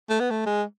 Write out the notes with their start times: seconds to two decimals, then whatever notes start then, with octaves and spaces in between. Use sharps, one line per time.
0.10 A3
0.20 B3
0.30 A3
0.46 G#3